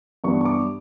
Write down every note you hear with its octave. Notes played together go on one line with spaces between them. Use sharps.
G2 E3 G3 B3 D4 C#6
C#6
D6